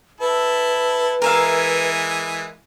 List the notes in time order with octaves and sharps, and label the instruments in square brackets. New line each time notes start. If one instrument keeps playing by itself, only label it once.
[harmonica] E4 A4 [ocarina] B4
[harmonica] E3 G#3 G#5 [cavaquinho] A#4 E5 F5